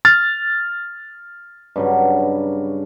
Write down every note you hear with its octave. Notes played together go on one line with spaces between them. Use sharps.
F6 A6
G2 C#3 F#3